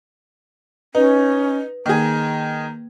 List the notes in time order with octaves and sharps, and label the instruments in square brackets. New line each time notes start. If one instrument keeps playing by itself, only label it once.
[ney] C#4 [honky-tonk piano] D#4 [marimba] B4
[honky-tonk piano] D#3 G#4 [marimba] A#3 [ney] A#5